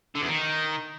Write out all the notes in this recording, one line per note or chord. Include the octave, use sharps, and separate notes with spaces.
D3
E2
D#3